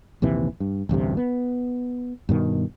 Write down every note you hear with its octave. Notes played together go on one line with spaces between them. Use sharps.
A#1 D#2 C3 E3
G2
A1 D2 G2 C3
B3
G2 B2 D#3